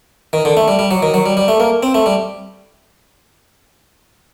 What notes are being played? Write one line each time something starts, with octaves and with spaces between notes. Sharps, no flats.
D#3
D3
A3
G3
G3
F#3
D#3
F#3
G3
G3
A3
A#3
C4
A3
G3